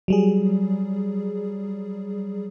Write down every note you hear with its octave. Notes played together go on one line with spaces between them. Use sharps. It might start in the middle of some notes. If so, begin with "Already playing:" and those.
F#3 G3 G#4